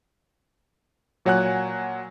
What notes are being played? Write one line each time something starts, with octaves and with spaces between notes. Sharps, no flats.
A#2 F#3 C#5 F#5 G#5 F#6